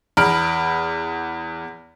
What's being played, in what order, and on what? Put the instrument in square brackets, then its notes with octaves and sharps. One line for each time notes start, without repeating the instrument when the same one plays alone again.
[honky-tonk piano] E2 B5 F6 D7